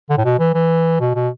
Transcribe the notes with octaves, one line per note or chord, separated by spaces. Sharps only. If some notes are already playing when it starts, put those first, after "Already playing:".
D3
A2
B2
E3
E3
B2
B2